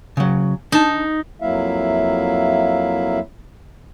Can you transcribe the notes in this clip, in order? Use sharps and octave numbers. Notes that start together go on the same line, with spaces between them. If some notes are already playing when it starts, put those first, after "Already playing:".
C#3 F#3
D4 D#4 A5
F2 F#3 A#3 E4 E5 F5